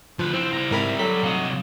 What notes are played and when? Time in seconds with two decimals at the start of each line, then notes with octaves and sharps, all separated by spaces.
0.19 D2 F3 B4
0.33 C4 E4 C5
0.53 G3 A#5
0.71 G#2 C3 C4 A#4 B5
0.99 F#3 A4 B6
1.24 C2 C4 D#5 F5 F#5